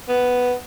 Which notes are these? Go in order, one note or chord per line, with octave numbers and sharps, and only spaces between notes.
B3